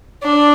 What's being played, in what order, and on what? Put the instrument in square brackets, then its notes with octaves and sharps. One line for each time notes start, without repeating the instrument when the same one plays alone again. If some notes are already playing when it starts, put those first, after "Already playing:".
[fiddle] D4